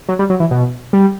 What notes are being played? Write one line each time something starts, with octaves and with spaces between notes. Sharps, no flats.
F#3
G3
F#3
E3
B2
G3